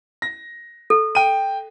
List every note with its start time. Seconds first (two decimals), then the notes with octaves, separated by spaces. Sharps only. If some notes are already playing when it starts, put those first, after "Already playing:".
0.22 A#6
0.90 A4
1.15 G5 D#7